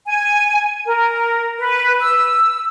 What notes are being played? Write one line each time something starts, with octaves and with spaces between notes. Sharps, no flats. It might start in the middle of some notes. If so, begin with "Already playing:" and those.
G#5
A#4
B4
E6